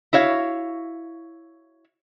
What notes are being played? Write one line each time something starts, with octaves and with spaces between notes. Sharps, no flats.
E4 F#4 C#5 F5